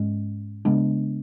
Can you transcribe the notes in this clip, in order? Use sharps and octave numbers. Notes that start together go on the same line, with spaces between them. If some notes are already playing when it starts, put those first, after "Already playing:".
Already playing: G#2 G#3 C#4
C#3 G#3 B3 D4